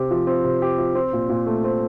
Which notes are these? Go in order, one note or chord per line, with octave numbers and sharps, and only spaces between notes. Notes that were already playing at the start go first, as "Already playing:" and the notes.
Already playing: C3 C4 G4
F3
C4
C3
G4
F3
C4
A#2
A#2
A3
C4